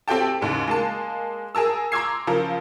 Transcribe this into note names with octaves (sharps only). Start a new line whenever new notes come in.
C4 G4 A4 G5 A5
D#2 G#2 C#3
G#3 A#3 A5
G#4 A#4 A5 E6
A#5 C6 D6 E6 G#6 C7
C#3 F3 A#4